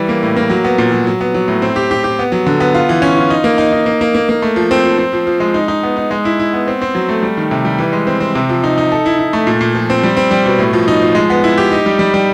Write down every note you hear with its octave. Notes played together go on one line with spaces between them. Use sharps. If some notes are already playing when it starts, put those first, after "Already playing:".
Already playing: E3 G3
A#3
A2
A#3
F#3
B3
A#2
F#3
F#3
B3
F#3
A2
C4
G4
G4
G4
B3
F#3
D3
B3
F4
E3
C#4
F4
D#4
A#3
D#4
D#4
A#3
A#3
A#3
A#3
A3
F3
C4
F3
C4
F3
F3
G#3
D#4
D#4
B3
D#4
G#3
E4
E4
B3
C4
C4
F#3
A3
G3
D#3
C3
G3
E3
G#3
C4
C4
C3
F3
D#4
D#4
A4
E4
E4
A3
A#2
A#2
F3
C4
G3
C4
G3
B2
A2
F3
D#4
F3
G#3
B3
E4
G4
D#4
G3
G3
G3